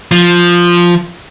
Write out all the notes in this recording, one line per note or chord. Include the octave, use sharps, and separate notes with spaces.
F3